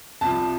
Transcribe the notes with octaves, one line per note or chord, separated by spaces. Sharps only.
C2 C3 F3 A5